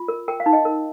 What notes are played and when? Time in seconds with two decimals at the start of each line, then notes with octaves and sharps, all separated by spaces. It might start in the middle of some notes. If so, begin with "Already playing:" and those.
Already playing: F4
0.08 A#4
0.28 A#4 G5
0.40 F5
0.46 D#4
0.53 D#5 G5
0.65 A#4